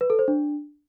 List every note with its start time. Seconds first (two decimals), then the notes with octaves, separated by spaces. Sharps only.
0.01 B4
0.10 A4
0.19 C5
0.28 D4